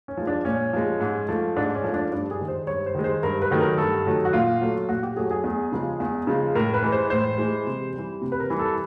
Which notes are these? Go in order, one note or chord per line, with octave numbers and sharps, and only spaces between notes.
C#4
F3 G#3
D4
A#2 C#4
F3 G#3
G#2
F3 A3
G#2 D4
C#4
F3 A3
D4
G2 D4
G#4
D#3 G#3
C5
G2 C#5
C5
D#3 G#3
C5
G2 A#4
B4
D#3 F#3 A3
A#4
G2 A4
D#3 F#3 A3
F#4
A#2 F4
F#3 A3
A#2 F#4
G4
F#3 A3 G#4
G#4
E2
C#3 F3 G#3
E2
C#3 F3 G#3
A2 A#4
B4
E3 G#3
C5
A2 C5
E3 G#3
C3
E3 G3
C3
B4
A#4
E3 G3
A4